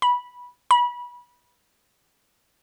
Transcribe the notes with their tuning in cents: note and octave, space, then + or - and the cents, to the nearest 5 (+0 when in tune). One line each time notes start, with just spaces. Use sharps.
B5 -15
B5 -25